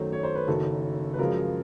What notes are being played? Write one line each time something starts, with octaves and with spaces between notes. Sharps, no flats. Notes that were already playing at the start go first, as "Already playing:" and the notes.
Already playing: F#2 D#3 F#3 A3 C5
C#5
C5
B4
F#1 F#2 D#3 A4
B4
F#2 C#3 F3 G#3 A#4